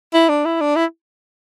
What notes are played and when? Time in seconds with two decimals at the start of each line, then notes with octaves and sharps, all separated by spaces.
0.14 E4
0.29 D4
0.45 E4
0.61 D4
0.76 E4